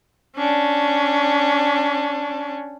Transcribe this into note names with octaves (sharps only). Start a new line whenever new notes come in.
C#4 D4